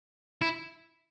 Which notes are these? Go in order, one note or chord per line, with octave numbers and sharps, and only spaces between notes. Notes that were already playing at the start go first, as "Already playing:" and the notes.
E4